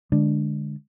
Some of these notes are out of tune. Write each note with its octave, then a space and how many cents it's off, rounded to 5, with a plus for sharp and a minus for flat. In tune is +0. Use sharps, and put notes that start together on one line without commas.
D3 +5 G#3 +0 D4 +0